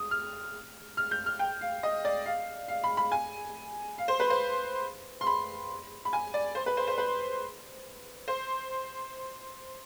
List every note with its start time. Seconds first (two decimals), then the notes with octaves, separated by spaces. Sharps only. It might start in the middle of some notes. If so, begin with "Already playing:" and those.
Already playing: D#6
0.11 F6
0.97 F6
1.11 G6
1.26 F6
1.39 G5
1.61 F5
1.83 D#5
2.05 D5
2.26 F5
2.68 F5
2.84 B5
2.97 B5
3.12 G#5
3.98 F5
4.08 C5
4.20 B4
4.30 C5
5.21 C6
5.27 B5
6.05 B5
6.13 G#5
6.34 D5
6.55 C5
6.66 B4
6.77 C5
6.87 C5
6.98 B4
8.28 C5